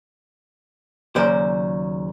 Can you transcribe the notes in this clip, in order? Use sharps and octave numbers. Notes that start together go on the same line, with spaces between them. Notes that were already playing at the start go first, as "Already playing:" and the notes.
D#2 C#3 F#3 C5 D5